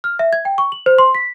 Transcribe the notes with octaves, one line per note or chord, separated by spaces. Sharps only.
F6
E5
G#6
G5
C#6
F#7
C5
C6
B6